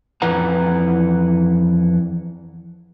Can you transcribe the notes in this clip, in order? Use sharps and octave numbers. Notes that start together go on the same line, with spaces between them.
F2 E3 B4 F#5 A#5